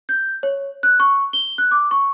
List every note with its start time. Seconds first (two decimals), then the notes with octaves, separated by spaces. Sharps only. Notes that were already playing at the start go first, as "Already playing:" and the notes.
0.09 G6
0.43 C#5
0.83 F#6
1.00 C#6
1.33 G7
1.58 F#6
1.71 D6
1.91 C#6